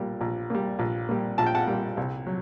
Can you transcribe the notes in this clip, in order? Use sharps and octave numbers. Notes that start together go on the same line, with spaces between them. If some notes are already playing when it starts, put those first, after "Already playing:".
Already playing: A#1 A#2 G3
A#1
A#2 G3
A#1
A#2 G3
A#1 A5
G5
F#5 A5
A#2 G3
C2
F#3